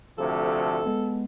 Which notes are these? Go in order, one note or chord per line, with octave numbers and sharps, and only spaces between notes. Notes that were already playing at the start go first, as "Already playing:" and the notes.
D2 C3 F3 A4
G#3 B3